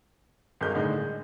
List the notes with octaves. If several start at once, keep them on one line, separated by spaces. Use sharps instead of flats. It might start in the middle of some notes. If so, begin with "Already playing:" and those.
G#1 G2 G#4 A#4 D#5 G6
A2 D3 D#4 G#4
G#3